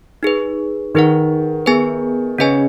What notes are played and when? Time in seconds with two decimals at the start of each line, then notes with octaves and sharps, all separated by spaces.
0.23 D#4 G#4 B4
0.95 D#3 D#4 G#4 B4 F#5
1.66 B3 G#4 B4 G#5
2.38 C#3 C#4 G#4 B4 D#5 G#5